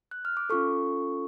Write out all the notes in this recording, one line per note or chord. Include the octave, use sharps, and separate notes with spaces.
F#6
F6
D6
C#4 F4 A4 C#6